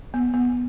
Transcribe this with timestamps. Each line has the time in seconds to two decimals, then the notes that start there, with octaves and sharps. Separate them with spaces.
0.14 B3
0.34 B3